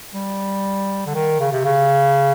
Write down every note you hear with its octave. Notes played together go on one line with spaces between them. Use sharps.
G3
D3
D#3
C#3
C3
C#3